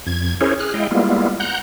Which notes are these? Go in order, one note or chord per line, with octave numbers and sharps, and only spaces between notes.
F2 G#6
C#4 E4 G#4 A#4 C5 C#5
G#4 F6 F#6
G#3 E4 D#5 F5 G5
G3 G#3 A#3 B3 E4 F4
F#5 A#5 F#6 G6